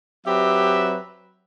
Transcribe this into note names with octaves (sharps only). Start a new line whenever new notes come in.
F#3 C4 G4 B4 E5